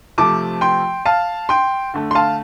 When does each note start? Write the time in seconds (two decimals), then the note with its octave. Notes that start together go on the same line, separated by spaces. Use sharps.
0.18 C3 F3 A3 A5 D6
0.61 G5 C6
1.06 F5 A5
1.49 G5 C6
1.94 D3 A3
2.11 C6
2.15 F5 A5